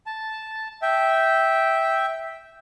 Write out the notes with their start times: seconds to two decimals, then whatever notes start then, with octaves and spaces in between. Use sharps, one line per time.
0.06 A5
0.82 E5 G5